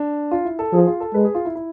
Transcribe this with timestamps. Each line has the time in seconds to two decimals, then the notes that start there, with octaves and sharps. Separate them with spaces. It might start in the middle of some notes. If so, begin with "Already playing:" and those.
Already playing: D4
0.31 F4
0.45 E4
0.59 A4
0.73 F3 G#4
0.87 F4
1.00 A4
1.14 G#3 B4
1.25 G#4
1.35 F4
1.45 E4
1.55 E4